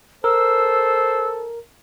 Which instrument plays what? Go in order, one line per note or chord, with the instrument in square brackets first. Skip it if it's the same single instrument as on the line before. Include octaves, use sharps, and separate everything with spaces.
[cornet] A4 [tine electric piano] A#4 [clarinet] C5 [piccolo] E6